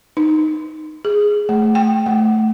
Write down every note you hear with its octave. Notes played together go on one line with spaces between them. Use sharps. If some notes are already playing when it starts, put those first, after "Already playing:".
D#4
G#4
A3
G5
A3